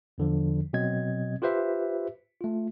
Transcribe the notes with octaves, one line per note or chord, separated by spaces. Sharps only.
E2 D3 F3
B2 F#3 C4 D#5 G#6
F4 G4 B4 C5 E5
A3 F4